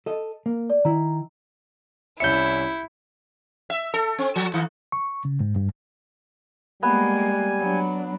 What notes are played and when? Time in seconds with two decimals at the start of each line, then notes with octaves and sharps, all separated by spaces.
0.06 A4 D#5
0.46 A#3
0.70 D5
0.85 D#3 E4 A#5
2.20 C2 C#4 E4 E5 G6 C#7
3.70 E5
3.94 A4
4.18 C4
4.36 F3
4.54 D#3
4.92 C#6
5.25 C#3
5.40 G#2
5.56 G2
6.83 G3 G#3 A#3 B3 G#5
7.60 F#3 D4